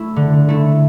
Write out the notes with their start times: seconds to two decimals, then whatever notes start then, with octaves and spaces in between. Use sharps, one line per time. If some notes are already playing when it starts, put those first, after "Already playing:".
Already playing: A3 E4
0.16 D3
0.49 A3 E4